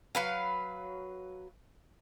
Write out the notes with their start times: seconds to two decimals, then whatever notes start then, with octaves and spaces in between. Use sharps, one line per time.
0.15 F#3 B4 F5